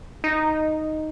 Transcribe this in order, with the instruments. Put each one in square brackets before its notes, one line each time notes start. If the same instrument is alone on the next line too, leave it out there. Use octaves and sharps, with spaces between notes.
[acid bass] D#4